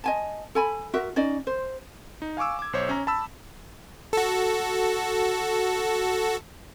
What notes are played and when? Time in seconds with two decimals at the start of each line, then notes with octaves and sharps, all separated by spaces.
0.04 D#5 G#5 A5
0.55 A4 G#5 B5
0.94 F#4 A#4 E5
1.16 C#4 D#4 D5 D#5
1.47 C5
2.22 D#4
2.37 F5 G#5 C#6 D6 E6
2.59 D6 G#6
2.73 B1 C5 C#5
2.89 C#4 A#5
3.07 A5 B5 E6
4.13 F#4 A4